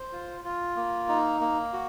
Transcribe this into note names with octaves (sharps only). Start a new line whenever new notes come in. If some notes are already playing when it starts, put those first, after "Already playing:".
Already playing: C5
F4
F4
A#3
D#4
A#3
F#4